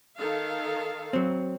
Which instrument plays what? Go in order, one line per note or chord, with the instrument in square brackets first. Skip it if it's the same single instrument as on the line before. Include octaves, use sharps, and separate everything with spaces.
[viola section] D#3 A4 F5
[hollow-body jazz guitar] F#3 C4